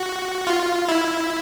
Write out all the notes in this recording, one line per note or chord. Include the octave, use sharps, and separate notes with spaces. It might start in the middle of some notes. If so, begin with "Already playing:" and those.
Already playing: F#4
F4
E4